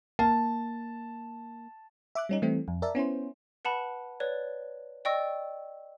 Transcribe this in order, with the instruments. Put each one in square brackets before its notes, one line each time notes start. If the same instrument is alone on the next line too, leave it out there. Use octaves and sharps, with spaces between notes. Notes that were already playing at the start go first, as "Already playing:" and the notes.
[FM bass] A#3 [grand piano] A5
[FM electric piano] E5 D6 F#6
G3 C#4 D#4
E3 G3 A3 C4
F2
A#4 D5 E5 A5
B3 C#4 E4 C5
[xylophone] B4 F#5 A5 B5
B4 C#5 D5
D5 D#5 G5 C#6 E6 A#6